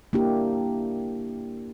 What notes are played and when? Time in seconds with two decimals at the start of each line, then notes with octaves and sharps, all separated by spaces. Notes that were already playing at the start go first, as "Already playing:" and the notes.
0.13 A#3 D4 E4 G4